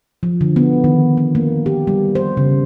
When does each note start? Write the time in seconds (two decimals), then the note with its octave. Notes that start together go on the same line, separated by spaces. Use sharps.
0.23 F3
0.41 D3
0.56 B3
0.84 D#3
1.17 B3
1.35 A#3
1.66 G4
1.87 G3
2.15 C5
2.37 C#3